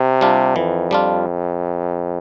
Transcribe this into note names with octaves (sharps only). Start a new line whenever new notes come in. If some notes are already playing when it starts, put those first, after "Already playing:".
Already playing: C3
G3 D4 F4
F2 E3
G3 D4 F4